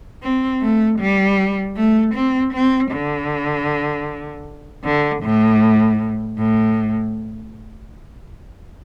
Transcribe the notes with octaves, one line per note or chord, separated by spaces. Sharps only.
C4
A3
G3
A3
C4
C4
D3
D3
A2
A2